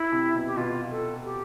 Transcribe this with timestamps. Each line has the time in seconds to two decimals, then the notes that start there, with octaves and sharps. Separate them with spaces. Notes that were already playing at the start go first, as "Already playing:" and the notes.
Already playing: E4
0.12 C3
0.35 B2
0.46 G4
0.57 B2 F4
0.91 A4
1.25 G4